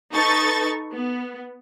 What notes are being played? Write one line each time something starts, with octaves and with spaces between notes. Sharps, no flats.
D#4 A4 B4 C#6 A6
B3